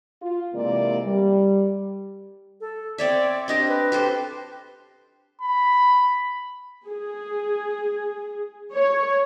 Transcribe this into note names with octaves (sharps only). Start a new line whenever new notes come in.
F4
C3 E3 G#3 A#3 A#4 D5
G3
A4
C4 C#5 D5 E5
C4 D4 G4 D#5
B4
G4 A4 C5
B5
G#4
C#5